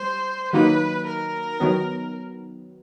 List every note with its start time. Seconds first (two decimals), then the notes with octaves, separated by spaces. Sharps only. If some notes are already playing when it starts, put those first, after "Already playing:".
Already playing: G3 C5
0.53 D#3 F#3 A#3 D#4 B4
1.06 A#4
1.60 D#3 F#3 B3